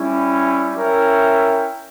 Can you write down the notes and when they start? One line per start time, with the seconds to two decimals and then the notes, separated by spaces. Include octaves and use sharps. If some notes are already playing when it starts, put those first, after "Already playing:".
Already playing: G3 C#4 E4
0.75 C#4 E4 A#4 E5 G5